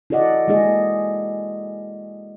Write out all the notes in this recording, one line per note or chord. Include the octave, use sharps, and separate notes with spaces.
E4 F#4 A4 D5 D#5 F#5
G#3 A#3 E4 G#4 D#5